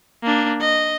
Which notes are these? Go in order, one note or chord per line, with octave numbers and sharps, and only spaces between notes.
A#3 D4
D#5